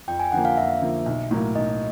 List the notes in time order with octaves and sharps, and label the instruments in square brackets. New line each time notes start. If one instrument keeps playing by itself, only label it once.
[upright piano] F2 [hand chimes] G5
[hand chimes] G#5
[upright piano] D3 F3 A#3 [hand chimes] F#5
[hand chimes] F5
[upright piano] F2 [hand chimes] E5
[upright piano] D3 F3 A#3
B1
A2 F#3 A#3
[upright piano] B1 [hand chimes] D#5